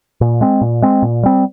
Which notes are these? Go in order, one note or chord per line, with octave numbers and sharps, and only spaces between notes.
A#2
G#3 C4
A#2
G#3 C4
A#2
G3 C4